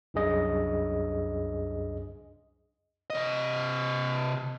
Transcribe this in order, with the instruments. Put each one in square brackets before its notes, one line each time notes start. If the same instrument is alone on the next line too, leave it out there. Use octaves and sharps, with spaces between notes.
[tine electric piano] C2 F#2 D4 G#4 D#5
[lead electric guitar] C3 D#5